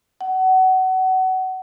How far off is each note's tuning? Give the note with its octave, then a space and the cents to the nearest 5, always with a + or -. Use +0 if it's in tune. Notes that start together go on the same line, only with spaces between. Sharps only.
F#5 +25